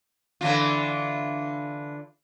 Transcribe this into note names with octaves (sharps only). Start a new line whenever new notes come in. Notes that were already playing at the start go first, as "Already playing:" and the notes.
D3 E3 F4